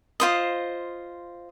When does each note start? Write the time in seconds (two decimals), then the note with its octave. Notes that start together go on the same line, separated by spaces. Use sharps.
0.20 F4 C5 D#5